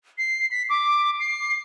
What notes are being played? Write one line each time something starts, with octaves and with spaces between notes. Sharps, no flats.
C7
B6
D6
C7